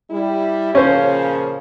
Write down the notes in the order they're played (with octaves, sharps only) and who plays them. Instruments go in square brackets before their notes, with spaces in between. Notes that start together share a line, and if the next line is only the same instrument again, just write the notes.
[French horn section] G3 E4
[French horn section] A#2 C#3 F3 [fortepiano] C#4 C5